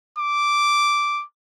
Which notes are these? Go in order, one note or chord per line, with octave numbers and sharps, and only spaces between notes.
D6